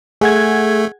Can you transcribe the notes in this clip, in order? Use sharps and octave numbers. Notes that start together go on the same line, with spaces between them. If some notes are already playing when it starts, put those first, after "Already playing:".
A3 G#4 F#5 G#6